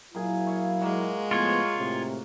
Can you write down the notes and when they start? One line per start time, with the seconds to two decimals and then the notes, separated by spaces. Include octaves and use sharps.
0.15 A#2 F#3 E4 G#4 G#5
0.47 C#5 F5
0.81 G#3 A#3 F#4
1.31 A2 F3 B3 F4 C#5
1.78 A2 C3